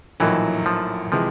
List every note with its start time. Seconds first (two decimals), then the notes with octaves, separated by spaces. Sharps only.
0.20 A#1 A2 E3 F#3 A#3 D#4
0.66 F3
1.12 C3 E3 F3 G#3